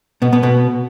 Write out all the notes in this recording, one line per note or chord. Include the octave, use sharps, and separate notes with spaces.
B2 B3
B2 B3
B2 B3